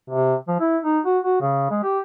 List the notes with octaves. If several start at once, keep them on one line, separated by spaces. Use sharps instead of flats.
C3
F3
E4
D#4
F#4
F#4
C#3
G#3
G4